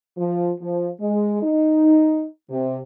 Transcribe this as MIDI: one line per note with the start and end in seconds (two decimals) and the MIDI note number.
0.18 0.51 53
0.60 0.88 53
1.00 1.41 56
1.43 2.26 63
2.50 2.78 48